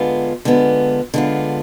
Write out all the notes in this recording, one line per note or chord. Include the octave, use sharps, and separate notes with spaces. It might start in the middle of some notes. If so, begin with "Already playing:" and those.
Already playing: D3 G#3 B3 F4
D3 G#3 B3 F4
D3 G#3 B3 F4